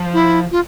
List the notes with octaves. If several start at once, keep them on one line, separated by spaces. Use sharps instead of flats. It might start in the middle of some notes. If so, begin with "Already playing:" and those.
Already playing: F3
E4
F4